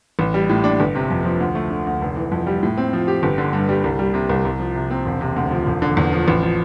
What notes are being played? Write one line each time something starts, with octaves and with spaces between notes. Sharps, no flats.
A1
G3
A2
D4
G1
C3
F2
F3
D2
A3
D3
D2
F1
E3
F2
G3
A2
C4
F3
G4
G1
D3
G2
G3
C2
G3
C3
C2
C2
F3
C3
C4
E1
C3
D2
F3
E1
D3
E2
F3
A1
F3